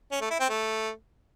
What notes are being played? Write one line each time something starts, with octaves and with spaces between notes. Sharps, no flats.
C#4
A3
E4
C4
A3